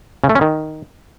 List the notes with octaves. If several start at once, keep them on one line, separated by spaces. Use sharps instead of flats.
C#3
A3
C#4
D#3